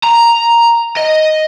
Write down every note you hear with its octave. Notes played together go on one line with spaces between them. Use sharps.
A#5
D#5